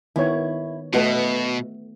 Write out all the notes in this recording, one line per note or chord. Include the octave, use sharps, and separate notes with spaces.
D#3 B3 E4 C#5
B2 A3 B3 F#4 B4 D#5